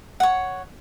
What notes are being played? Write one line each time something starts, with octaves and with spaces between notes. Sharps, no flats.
C#5 F#5